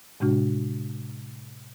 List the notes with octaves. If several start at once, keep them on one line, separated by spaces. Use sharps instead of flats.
A2 C3 G#3 D4 F#4